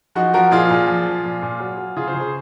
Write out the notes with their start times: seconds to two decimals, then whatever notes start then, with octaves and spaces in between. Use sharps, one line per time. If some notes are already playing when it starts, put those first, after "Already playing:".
0.15 F3 D#4 F#4
0.34 F3 F#4 A#4
0.51 A#2 F4 G#4
0.70 A#2
0.87 F3
1.06 F3
1.24 A#2
1.42 A#2
1.60 F#3
1.77 F#3
1.97 C#3 F4 G#4
2.07 G#4 C5
2.14 C#3
2.20 G#4 C5